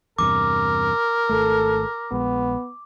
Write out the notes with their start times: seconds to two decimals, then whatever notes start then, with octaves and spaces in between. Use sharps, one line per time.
0.19 E2 G2 C3 A#4 D6
1.29 G#1 A3 A4
2.12 A#1 G#3 B3